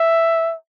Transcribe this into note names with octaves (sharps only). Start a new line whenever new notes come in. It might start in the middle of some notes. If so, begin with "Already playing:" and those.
Already playing: E5